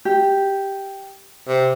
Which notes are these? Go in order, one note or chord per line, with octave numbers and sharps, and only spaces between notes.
G4
C3